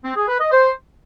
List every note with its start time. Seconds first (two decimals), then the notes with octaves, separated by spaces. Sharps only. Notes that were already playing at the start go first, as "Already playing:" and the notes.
0.05 C4
0.16 G#4
0.28 B4
0.40 D#5
0.52 C5